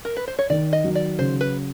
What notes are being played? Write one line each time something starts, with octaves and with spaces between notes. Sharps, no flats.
A#4
B4
C5
C#5
D#3 D5
D#5
F#3
D5
C#3 C5
B4